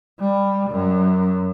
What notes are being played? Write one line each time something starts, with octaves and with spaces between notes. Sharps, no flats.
G3
F#2